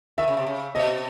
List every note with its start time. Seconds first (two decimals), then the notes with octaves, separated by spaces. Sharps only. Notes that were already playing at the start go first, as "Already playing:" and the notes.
0.18 D#3 E5
0.28 C#3
0.37 C3
0.46 C#3
0.75 B2 D#5